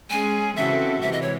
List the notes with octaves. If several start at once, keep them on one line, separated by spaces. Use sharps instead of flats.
G#3 C#4 G#4 G#5
C#3 E3 C4 F#4 A4 E5
C3 E3 G#3 E5
D#5
C#5